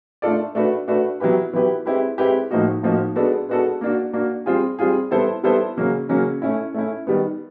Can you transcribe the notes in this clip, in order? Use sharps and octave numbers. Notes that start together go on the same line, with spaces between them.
A3 D4 F4 A4 D5
A3 D4 F#4 B4
A3 D4 F#4 B4
F#3 B3 E4 G4 B4
F#3 B3 E4 G4 B4
G#3 C4 E4 G4 B4
G#3 C4 E4 G4 B4
A2 F3 A#3 D#4 F#4
A2 F3 A#3 D#4 F#4
G#3 B3 D4 F#4 A4
G#3 B3 D4 F#4 A4
A#3 D4 F#4
A#3 D4 F#4
G3 C4 F4 G#4
G3 C4 F4 G#4
G3 B3 E4 A4 C5
G3 B3 E4 A4 C5
C#3 F#3 A#3 C#4
C#3 F#3 A#3 C#4
A3 C#4 E4
A3 C#4 E4
D#3 G3 B3